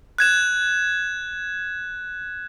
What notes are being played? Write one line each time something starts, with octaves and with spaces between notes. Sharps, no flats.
F#6 G#6 E7